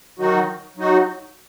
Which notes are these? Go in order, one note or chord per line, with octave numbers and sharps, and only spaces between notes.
D#3 F#3 D#4 F#4
F#3 D#4 F#4